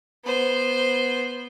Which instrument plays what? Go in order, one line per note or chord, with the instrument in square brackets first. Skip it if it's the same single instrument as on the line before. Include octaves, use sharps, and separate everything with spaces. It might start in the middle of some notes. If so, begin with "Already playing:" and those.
[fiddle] B3 C5